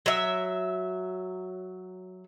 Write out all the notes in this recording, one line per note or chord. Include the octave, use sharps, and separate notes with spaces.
F#3 E5